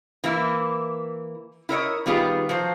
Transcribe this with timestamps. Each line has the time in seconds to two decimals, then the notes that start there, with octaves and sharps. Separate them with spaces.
0.24 E3 A#3 E4
1.69 E4 A#4 C#5 D#5
2.06 D#3 G3 B3 F4 G#4
2.49 F3 F#3 C5